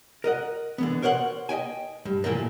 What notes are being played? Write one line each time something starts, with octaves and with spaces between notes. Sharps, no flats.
A#4 D#5 F#5
D3 E3 B3
A#4 C5 C#5 F5 F#5
D#5 E5 G5 G#5
G2
A#2 E3 F3 A3 A#3